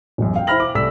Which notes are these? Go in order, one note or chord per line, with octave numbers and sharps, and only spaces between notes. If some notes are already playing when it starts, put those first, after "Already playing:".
E1 A1 F#2
F5 G5
E4 C5 B5 F6 A#6 F#7
D6
C2 A3 D5 E6 B6